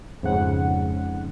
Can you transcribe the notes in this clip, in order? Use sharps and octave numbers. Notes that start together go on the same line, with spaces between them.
F2 G#2 C#3 F#5